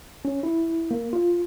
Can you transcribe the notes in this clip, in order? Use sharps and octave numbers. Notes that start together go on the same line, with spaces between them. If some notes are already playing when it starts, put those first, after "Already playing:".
C#4
E4
A#3
F4